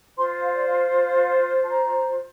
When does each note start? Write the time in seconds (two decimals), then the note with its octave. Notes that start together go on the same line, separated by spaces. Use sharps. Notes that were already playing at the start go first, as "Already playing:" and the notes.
0.16 F4 C5 C6
0.42 F5
0.54 D5
0.67 F5
1.63 A5
1.68 A#5